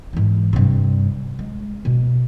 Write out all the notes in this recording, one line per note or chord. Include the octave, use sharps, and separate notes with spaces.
G#2 E3
G2 C3
G#3
B2